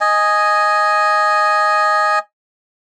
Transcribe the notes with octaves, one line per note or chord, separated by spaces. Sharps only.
D#5 G#5